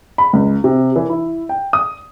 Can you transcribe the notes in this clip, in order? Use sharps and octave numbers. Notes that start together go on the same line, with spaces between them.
B5
C#2
C3
E3
E4
G5
D#6